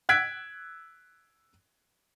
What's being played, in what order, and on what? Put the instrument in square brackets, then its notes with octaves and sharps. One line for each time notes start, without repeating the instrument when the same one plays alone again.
[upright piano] E6 F#6 G#6 B6 D7